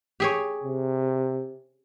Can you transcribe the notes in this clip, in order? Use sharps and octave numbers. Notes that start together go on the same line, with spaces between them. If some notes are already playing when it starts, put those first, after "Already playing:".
G4 G#4 C#5
C3